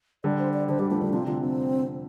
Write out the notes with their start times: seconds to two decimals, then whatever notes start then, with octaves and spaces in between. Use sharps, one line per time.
0.24 D3 G3 D5
0.39 C5
0.53 D5
0.69 D3 C5
0.79 D3 G3 G4
0.91 F3 A3 D4
1.01 D3 G3 D4
1.13 C3 F3 F4
1.27 D3 F4
1.41 C3 C4